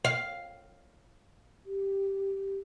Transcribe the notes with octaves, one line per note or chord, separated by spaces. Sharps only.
F5
G4